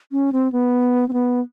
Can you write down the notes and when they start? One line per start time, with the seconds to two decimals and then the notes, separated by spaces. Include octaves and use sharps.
0.12 C#4
0.33 C4
0.52 B3
1.09 C4
1.13 B3